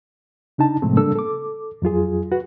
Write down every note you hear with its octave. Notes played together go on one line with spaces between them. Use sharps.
C#3 D4 D#4 A5
A2 C3 F3 G#3 A3 C4
C#3 G3 A#3 D4 A4 E6
A4 D6
F2 F#3 F4 G#4
F#4 B4